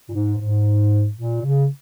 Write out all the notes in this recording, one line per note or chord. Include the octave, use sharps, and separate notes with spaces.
A#2
G#2
G#2
A#2
C#3